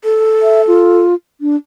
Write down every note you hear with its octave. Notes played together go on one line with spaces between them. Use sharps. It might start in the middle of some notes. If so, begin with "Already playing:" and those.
A4
E5
F4
D4